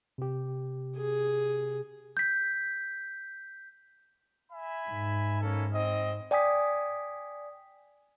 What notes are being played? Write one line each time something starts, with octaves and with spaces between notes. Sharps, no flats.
C3 G4
G#4
G6 B6
E5 G#5 B5
G#2
A#3 C#4 A4
C4 D#5
D5 G5 G#5 D#6 B6